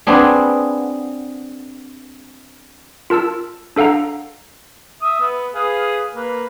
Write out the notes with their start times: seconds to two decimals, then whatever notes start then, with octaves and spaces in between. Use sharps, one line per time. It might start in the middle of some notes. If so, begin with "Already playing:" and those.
0.07 B3 C4 D4 G#4
3.10 F4 A#4 A5 E6
3.76 D4 A4 F5 F#5 A#5
5.02 E5 D#6
5.20 B3
5.55 G#4 B4 F5
6.15 A#3 B4